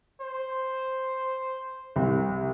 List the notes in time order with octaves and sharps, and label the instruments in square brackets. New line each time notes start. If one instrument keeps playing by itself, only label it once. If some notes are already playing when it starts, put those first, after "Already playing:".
[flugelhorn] C5
[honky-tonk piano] C2